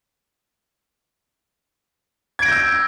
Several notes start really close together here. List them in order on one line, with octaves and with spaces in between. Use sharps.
G#6 D7 A#6 G6 E6